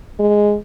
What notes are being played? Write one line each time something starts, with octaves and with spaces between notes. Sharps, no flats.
G#3